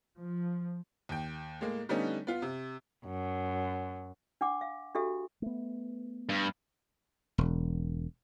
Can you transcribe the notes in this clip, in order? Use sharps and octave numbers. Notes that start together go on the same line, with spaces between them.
F3
D#2 G5
A2 G#3 A#3
D3 G3 A3 B3 C#4 D#4
B3 F4
C3
F#2
D4 F#5 D6
F5
D4 F#4 G4 A4 E5
A3 B3
G2
E1